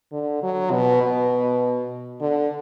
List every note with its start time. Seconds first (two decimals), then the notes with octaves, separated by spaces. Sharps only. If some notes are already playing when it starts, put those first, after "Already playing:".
0.12 D3
0.43 F#3
0.72 B2
1.03 B2
2.21 D3